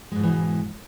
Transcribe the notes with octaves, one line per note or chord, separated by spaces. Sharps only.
G#2 B2 E3 F3 G#3